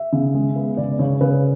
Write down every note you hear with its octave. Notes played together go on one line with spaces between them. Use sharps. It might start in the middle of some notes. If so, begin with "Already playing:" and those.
Already playing: E5
C#3
G#3
B3
C#3 D5
C#3 C#5
C#3 B4